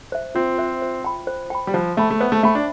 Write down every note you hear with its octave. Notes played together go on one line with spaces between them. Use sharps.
C5 E5
C4 F4
C5 E5
C5
G5 B5
C5
G5 B5
G3
F3 C5
A3 E5 G5 B5
A3
B3 C5
A3
A3 E5 G5 B5
D4